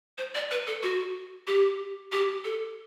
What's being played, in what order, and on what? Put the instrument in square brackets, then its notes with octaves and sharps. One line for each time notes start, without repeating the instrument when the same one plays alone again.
[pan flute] C5
D5
B4
A4
F#4
G4
G4
A4